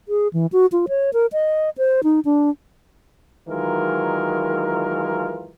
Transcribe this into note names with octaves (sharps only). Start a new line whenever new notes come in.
G#4
E3
F#4
F4
C#5
A#4
D#5
C5
D#4
D4
D#3 E3 F#3 G#3 F4 A#4